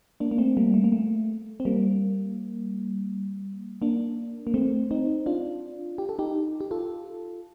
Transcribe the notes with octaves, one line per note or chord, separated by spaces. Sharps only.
A#3 D4
A#3
A3 C4
G3 A#3
A3
A#3
A3
C4
G3 A#3
A#3 D4
A#3
A3 C4
C4 D#4
D4 F4
G4
A4
D#4 G4
G4
F4 A4